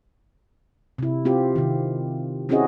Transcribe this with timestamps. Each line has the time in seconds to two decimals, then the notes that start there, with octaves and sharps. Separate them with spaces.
0.98 C3 E4
1.25 C4 F4 G4
1.56 C3 D#3
2.49 C4 C#4 E4 F#4 G#4 D#5